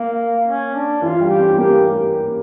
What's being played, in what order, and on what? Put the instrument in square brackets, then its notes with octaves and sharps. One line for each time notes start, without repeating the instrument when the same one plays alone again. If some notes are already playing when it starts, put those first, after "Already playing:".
Already playing: [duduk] A#3
C#4
D4
[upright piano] E3 [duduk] F4
[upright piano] G3
[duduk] G4
[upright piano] C#4
C#4
[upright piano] A#3 [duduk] G4